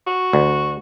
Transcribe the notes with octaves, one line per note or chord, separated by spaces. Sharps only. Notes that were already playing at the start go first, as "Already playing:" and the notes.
F#4
D2